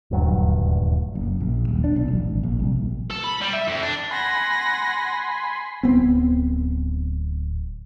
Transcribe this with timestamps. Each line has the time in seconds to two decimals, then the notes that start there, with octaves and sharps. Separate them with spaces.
0.11 D#1 D2 G2 F#3
1.15 F#1
1.40 A#1
1.69 D#1
1.84 D4
1.96 B1
2.12 A1
2.26 G#1
2.43 A#1
2.60 C2
2.76 A#1
3.11 A4
3.24 B5
3.41 G3
3.53 E5
3.68 F2
3.82 D4
4.11 F#5 G#5 B5 C6 A#6
5.83 D1 B3 C4